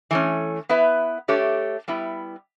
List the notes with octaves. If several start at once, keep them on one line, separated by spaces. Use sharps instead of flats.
E3 A3 C#4
B3 E4 B4 E5
A3 D4 G4 C#5
G3 B3 E4